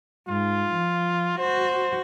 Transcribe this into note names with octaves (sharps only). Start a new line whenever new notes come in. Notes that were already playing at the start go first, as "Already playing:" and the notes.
G#2 F4
F3
F#4 C5